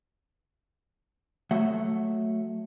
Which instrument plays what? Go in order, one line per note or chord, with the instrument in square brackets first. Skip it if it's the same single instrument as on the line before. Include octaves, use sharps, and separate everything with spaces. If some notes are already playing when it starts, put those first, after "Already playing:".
[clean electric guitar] F#3 A3 F#4 E5 F#5